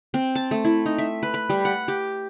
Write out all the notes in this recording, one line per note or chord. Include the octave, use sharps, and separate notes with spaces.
C4
A5
A3
E4
D#4
E5
B4
B5
G3
F#5
G4